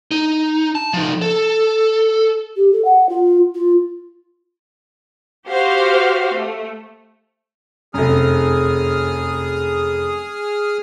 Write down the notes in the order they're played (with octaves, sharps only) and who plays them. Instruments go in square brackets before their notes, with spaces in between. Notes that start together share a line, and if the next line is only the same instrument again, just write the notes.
[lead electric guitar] D#4
A5
F3 D#4
A4
[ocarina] G4
A4
F#5
F4
F4
[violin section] F#4 G4 C5 F5
A3
[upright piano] F1 F#2 [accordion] G#4 D#6 F6